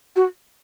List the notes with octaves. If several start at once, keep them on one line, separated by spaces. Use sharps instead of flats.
F#4